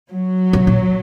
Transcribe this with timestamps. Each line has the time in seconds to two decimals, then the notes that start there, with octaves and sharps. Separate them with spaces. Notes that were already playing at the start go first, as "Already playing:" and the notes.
0.11 F#3
0.53 C3
0.67 A#2